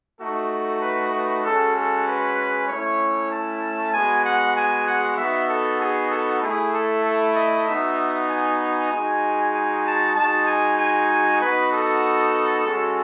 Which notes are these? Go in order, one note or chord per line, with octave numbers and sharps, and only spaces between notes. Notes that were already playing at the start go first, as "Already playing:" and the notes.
A3 D#4 F#4 A4
B4
B4
G#3 C#4 F#4 A4
A4
B4
A3 C#4 E4 C#5
A5
G#3 B3 F#4 G#5
F#5
G#5
F#5
B3 D#4 F#4 E5
A4
G#4
A4
A3 E4 G#4
A4
A4
D#5
B3 D#4 F#4 E5
G#5
G#5
G#3 D#4 F#4
G#5
A5
G#3 D#4 F#4 A5
G#5
G#5
B3 D#4 F#4 B4
A4
G#3 C#4 F#4